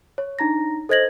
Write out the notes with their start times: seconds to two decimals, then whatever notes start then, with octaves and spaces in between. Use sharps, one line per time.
0.18 C#5
0.39 D4 D#4 A#5 A#6
0.89 A4 C5 D#5 G#6 A#6 F#7